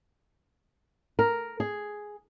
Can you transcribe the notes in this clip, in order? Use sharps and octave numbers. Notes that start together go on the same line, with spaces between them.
A#4
G#4